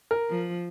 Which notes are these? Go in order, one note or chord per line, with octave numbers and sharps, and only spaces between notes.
A#4
F3